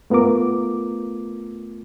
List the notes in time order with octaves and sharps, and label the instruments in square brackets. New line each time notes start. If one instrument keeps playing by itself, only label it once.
[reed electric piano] A3 B3 F4 A#4 D6